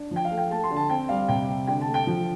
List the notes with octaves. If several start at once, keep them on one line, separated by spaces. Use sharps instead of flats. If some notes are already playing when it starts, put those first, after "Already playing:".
Already playing: D4
F3
G5
F5
A3
G5
A3 A5
C6
D3
A5
C4 G5
G3 F5
C3 G5
C3
D3 G5
A5
A3
G5
F3